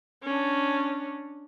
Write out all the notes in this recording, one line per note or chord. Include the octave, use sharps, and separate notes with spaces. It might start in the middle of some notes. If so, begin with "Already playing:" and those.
C#4 D4